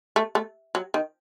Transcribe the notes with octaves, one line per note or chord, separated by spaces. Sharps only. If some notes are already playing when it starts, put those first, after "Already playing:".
A3
A3
F#3
D#3